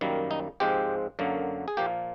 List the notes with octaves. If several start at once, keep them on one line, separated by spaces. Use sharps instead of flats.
F#2 D#3 G3 A#3
D#4
G#2 F3 G#3 C4 G4
F#2 D3 F#3 A#3
G#4
A#2 F3 A#3 G4